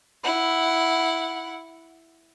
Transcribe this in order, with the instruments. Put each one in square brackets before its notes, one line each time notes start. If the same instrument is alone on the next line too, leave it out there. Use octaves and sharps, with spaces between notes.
[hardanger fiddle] E4 F#5